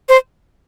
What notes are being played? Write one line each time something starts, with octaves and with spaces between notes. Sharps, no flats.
C5